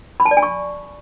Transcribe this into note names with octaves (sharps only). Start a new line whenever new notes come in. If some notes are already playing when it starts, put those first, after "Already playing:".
B5
A5
D5
G#5
C#6